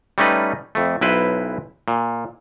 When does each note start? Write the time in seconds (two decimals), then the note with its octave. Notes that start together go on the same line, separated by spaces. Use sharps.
0.18 G3 A3 C#4 D#4 B4
0.75 F2 A3
1.01 B1 E4 B4 C5
1.88 A#2